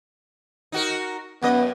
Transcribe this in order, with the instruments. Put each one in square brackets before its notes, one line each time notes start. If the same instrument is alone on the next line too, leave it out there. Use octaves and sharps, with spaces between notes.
[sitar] D#4 F#4 A#4
[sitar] F#2 D#5 [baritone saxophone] B3